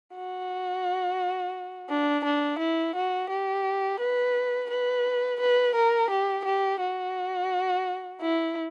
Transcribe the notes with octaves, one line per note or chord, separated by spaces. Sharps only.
F#4
D4
D4
E4
F#4
G4
B4
B4
B4
A#4
G4
G4
F#4
E4